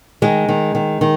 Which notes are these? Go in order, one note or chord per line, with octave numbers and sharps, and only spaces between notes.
D#3 G#3
D#3
D#3
D#3